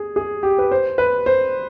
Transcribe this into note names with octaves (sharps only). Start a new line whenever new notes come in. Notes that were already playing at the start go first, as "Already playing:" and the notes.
Already playing: G#4
G#4
G4
B4
C5
B4
C5